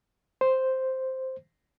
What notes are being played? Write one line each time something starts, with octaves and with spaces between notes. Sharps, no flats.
C5